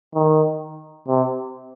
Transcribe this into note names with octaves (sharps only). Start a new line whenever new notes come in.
D#3
C3